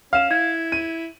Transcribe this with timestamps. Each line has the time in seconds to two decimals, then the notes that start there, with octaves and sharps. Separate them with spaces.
0.13 C#4 F5 F6 E7
0.31 E4 G#6
0.72 D#7